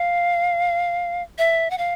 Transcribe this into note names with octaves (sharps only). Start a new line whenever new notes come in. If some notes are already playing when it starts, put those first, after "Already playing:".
Already playing: F5
E5
F#5
F5